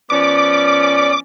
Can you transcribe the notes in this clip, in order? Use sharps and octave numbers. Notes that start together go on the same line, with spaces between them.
F3 B3 C#4 D5 D6